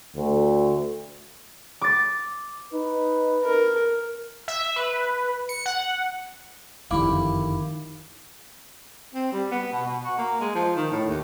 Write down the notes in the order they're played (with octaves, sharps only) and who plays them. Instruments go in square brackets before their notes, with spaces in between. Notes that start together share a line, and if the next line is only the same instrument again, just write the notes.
[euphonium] D2
[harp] D6 A6
[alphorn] D#4 [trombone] B4
[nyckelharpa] A#4
[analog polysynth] E5
B4
C#7
F#5
[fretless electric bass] F#1 F2 D3 [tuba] D#3 [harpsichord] E4 G4 [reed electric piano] F5 D6
[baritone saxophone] C4
G3
B3
B2
B2
F#4
A#3
G#3
F3
D#3
A2
D#2